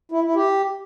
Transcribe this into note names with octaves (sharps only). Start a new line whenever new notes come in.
E4
E4
G4